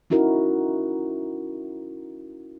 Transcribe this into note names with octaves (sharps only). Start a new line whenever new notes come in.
C#4 D#4 E4 F#4 A#4